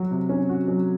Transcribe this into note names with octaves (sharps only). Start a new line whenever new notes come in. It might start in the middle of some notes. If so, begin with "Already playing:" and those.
Already playing: F#3 F#4
C3
C#4
F#4
F#3